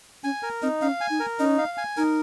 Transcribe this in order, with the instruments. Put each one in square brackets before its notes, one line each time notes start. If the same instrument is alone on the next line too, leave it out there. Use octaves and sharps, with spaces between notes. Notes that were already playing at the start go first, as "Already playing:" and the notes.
[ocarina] C#4 [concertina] G#5
[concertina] A#4
[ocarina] C4 [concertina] D#4
[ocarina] C#4 [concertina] F5
[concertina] G#5
[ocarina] D#4
[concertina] A#4
[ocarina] C#4 [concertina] D#4
[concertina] F5
G#5
[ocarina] D#4 [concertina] A#4